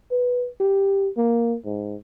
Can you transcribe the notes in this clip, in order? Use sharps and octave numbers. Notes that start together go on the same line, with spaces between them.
B4
G4
A#3
G#2